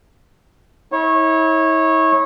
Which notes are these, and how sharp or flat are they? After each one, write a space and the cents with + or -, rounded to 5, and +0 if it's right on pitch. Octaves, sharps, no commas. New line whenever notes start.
E4 -40 C#5 -20